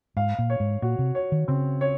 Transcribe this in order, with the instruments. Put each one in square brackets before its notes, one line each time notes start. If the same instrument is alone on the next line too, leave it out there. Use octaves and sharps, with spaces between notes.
[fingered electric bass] G#2 [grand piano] F5
[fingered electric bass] A#2
[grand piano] C#5
[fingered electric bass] G#2
[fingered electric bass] A#2 [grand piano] F#4
[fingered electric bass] C3
[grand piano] C#5
[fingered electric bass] D#3
[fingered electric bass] C#3 [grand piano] C4
[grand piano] C#5